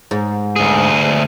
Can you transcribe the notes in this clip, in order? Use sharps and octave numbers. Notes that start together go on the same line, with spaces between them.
G#2
D2 G#4